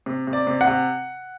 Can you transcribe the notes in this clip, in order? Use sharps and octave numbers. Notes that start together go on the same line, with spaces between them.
C3
C3
D5
C3
F#5
C3